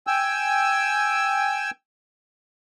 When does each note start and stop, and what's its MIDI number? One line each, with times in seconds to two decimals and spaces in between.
0.07 1.70 79
0.07 1.70 80
0.07 1.70 88